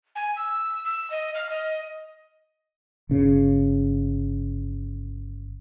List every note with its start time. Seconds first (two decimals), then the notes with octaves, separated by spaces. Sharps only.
0.15 G#5
0.36 E6
0.84 E6
1.10 D#5
1.34 F6
1.49 D#5
3.09 G1 C#3